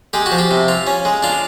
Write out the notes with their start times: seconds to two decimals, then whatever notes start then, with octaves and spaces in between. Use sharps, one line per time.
0.13 G#3 G4
0.26 F#4
0.32 F3
0.38 G4
0.51 C3
0.68 F4
0.87 C#4
1.05 G#3
1.23 D4 F4